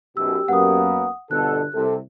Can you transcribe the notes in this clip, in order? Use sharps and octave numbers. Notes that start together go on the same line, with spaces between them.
B1 F#2 B2 G4 E6
F#2 A#3 B3 F#5 D#6
G1 B2 D3 A4 F#6
C2 C3 A4